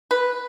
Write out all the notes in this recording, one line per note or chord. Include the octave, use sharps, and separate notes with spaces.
B4